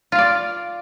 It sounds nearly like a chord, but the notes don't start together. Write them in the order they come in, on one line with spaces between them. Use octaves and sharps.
F4 F5 D5